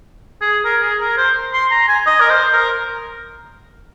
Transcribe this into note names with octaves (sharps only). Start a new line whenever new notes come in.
G#4
A#4
G#4
A#4
C5
C6
A#5
G#5
D#5
A#4
C5
A#4